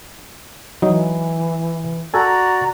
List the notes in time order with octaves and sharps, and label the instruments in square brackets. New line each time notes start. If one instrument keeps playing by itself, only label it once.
[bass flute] E3 [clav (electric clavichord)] F#3 D#4
[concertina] F#4 D5 [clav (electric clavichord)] A4 G#5 [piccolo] A#5